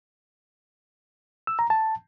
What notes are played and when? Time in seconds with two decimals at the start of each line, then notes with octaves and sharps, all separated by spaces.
1.47 E6
1.59 A#5
1.70 A5